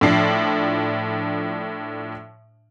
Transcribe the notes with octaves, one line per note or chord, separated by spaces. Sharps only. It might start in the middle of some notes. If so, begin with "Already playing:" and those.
A2 F3 D4 C7